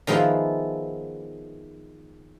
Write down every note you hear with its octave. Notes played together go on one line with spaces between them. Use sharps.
D#3 F3 G#3 B3 E4